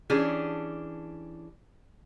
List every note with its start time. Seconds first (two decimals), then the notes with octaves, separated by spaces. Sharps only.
0.10 E3 C#4 D4 G4 G#4